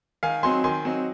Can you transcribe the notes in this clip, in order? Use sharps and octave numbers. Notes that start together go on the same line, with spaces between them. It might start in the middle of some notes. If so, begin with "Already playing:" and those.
D#3 F5 G#5
F#3 C4 D#4 G#5 C6
D#3 G#5 C6
F#3 C4 D#4